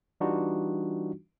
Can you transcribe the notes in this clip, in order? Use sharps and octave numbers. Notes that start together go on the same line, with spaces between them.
E3 G3 D4 D#4 F4 F#4